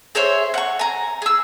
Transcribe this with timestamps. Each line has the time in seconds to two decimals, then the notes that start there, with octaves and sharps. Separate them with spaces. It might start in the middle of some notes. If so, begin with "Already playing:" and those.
0.15 G#4 C5 C#5 E5
0.54 F#5 C#6
0.79 G#5 A#5
1.22 G#4 E6